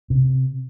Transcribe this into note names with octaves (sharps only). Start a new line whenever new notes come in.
C3